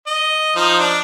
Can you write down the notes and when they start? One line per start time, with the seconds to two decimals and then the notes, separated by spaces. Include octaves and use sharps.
0.07 D#5
0.56 F3 D#4
0.79 D4